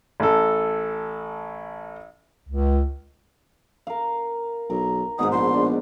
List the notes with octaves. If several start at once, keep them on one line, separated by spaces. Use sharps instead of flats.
A1 A4
C#2
A#4 F5
B1 A#4
G#1 G#2 B2 D#6
A#1 C6
D4